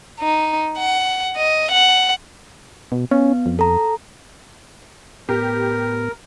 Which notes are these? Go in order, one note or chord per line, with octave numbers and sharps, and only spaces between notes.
D#4
F#5
D#5
F#5
B2
B3 C#4
F2
A4 A#5
A2 B3 G4 A#4